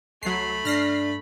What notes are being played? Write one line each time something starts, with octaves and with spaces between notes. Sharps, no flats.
C2 F#3 A3 B5 C7
G2 D4 F6 A#6 C7